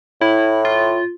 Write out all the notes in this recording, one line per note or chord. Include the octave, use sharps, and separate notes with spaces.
A2 E4
F4